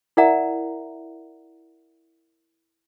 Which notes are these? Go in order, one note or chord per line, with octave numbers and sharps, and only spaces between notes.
E4 A#4 D5 E5 F#5 A#5